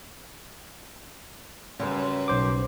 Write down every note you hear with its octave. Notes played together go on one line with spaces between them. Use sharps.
F#2 C#3 G3 B4
B1 C5 D6